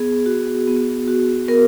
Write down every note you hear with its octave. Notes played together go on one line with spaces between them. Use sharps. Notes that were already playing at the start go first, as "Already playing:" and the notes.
Already playing: B3 G#4
F#4
B3
F#4
B3 A#4